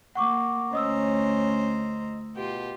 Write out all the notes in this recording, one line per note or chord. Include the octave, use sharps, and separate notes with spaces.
A#3 F#5 C#6 D6
D2 C#4 C5 D#5 A#5 D#6 E6
B2 F4 G4